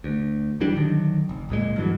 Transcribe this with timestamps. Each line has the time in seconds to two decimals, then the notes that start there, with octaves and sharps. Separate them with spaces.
0.04 D2
0.60 E1 E3 G3 D4
0.76 D3 D#3 F#3
1.29 F1
1.49 D1 C#2 A#2 G#3
1.76 G2 E3 F#3